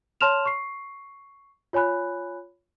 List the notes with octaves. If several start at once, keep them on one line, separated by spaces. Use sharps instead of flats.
C#5 A5 C6 F6 E7 F7
C#6 C7
F4 C#5 G#5 B5 F#6